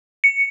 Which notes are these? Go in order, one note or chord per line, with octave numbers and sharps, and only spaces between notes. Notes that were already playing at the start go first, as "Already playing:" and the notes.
C#7